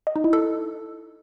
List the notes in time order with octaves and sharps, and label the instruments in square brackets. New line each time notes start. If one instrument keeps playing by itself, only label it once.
[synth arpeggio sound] D#5
D#4
E4
A4